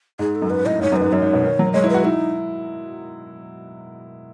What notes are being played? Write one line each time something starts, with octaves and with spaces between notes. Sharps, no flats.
G#2 G#4
A4
F#2
G#2 B4
A2 D#5
G#2 C#5
F#2 B4
G#2
F#2 C#5
G#2
B2
D#3
F#3
G#3 C#5
E4
F#4 B4
D#4 E4